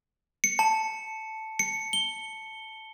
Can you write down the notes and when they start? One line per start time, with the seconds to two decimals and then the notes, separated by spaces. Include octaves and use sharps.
0.44 C#7
0.59 A5
1.59 C#7
1.93 G7